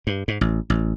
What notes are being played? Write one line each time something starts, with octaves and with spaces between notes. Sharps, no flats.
G2
G#2
A1
A1